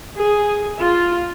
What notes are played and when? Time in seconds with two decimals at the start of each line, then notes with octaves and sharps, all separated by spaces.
0.16 G#4
0.80 F4